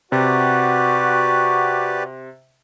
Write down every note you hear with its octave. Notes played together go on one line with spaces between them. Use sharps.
C3 F#4 G4 B4 D5